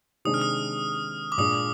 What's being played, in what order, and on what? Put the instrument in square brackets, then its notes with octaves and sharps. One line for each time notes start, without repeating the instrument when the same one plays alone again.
[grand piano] C3 D#3 G#3 D4 [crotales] D#6
[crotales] F6
D#6
D6
[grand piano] A#2 G#3 D4 [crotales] D#6